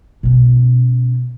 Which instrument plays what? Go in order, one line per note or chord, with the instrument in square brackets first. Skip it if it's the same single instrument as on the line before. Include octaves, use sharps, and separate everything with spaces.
[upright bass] B2 C#4